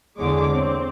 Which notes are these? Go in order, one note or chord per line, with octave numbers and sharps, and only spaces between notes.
E2 D3 G#3 C#5 D6
C4